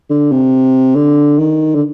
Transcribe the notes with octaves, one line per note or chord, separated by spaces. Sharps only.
D3
C3
D3
D#3
D3